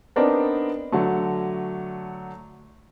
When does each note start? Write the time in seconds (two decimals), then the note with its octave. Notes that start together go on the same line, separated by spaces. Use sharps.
0.16 B3 C4 D4 D#4 A#4 B4
0.92 D3 F#3 A3